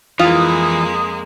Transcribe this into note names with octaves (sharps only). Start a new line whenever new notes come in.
F2 E3 G#3 A#3 F4 D#6